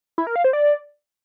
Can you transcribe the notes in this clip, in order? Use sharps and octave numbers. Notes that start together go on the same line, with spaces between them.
E4
A#4
F5
C5
D5